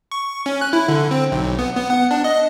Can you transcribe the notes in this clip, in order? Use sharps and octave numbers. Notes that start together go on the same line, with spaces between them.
C#6
C#4
F#6
E4
D3
C4
B1
B3
B3
F#5
D4
D#5